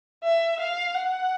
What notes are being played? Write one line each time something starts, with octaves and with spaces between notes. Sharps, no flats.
E5
F5
F#5